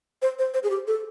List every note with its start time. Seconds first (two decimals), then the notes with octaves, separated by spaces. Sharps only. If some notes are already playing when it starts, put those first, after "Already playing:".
0.22 C5
0.39 C5
0.54 C5
0.63 G#4
0.70 G4
0.87 A4